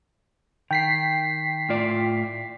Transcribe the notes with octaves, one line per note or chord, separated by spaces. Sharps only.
D#3 G5 B6 C7
A2 F4 D5